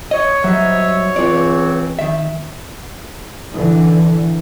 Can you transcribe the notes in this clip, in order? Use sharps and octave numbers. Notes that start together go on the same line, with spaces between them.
C#5 D#5
F#3 G3 C5 D#5 E5
C#2 E3 C4 F4 D5
D#3 E5
D3 E3